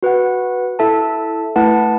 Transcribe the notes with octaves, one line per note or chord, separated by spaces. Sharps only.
F#4 B4 F#5
E4 A4 E5 A5
A3 E4 B4 F#5 A5